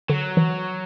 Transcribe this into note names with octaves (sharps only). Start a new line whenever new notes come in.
D3 F#3
E3